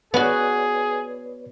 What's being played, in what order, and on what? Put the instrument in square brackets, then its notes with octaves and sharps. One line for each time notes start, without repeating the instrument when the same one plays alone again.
[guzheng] B3 F#4 [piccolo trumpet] G#4 [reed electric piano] B4 C#5 D5